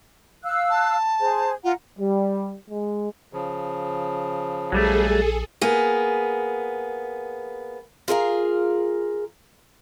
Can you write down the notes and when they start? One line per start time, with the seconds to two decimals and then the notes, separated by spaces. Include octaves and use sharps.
0.43 F5 E6 F#6
0.70 A5
1.20 G#4 C5
1.64 F4 F#5 A#5
1.99 G3
2.69 G#3
3.33 C#3 F3
4.72 A#1 F#3 G3 A3 G#4 A4
5.61 A#3 B3 G#4
8.08 F4 G#4 A#4 F5